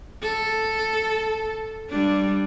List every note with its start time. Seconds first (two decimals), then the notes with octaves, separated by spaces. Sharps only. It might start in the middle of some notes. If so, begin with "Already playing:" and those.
0.23 A4
1.90 G3 D4